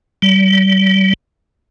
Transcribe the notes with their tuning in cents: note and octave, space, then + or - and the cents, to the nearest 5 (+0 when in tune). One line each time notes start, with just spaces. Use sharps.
G3 -35